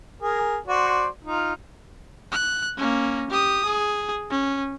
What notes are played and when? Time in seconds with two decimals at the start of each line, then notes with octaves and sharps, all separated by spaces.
0.22 G#4 A#4
0.68 F#4 C5 D5
1.24 D#4 F4
2.32 F#6
2.78 A#3 C#4
3.30 G4 D#6
3.65 G#4
4.30 C#4